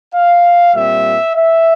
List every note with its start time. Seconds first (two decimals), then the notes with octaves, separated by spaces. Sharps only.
0.15 F5
0.75 A#2 G3 C4 E5
1.34 E5